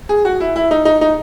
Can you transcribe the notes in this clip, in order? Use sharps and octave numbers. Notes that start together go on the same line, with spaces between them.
G#4
F#4
E4
E4
D#4
D#4
D#4